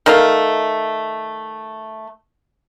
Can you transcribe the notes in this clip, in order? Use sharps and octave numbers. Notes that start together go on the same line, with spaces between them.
D#3 A3 F5